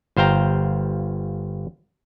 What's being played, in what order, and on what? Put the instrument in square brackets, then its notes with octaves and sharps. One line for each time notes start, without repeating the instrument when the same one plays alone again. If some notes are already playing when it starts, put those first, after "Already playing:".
[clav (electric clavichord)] G1 C5 F5 G5 A#5